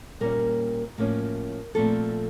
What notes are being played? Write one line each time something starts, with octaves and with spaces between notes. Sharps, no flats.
A#2 G3 A#3 C#4 A#4
A2 F3 A#3 C#4
A#2 F3 A3 C4 A4